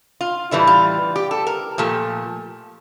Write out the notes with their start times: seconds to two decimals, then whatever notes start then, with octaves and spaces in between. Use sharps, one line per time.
0.21 F4
0.51 A2 E3 G3 E4
0.67 F4
1.16 G4
1.31 A4
1.47 A#4
1.78 A#2 F3 A3 G4